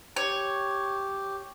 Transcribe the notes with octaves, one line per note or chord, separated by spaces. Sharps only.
G4 C#5